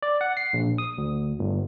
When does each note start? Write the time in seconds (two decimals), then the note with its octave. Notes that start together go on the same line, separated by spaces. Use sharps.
0.02 D5
0.21 F#5
0.37 C7
0.53 A#1
0.78 D#6
0.98 D2
1.39 G1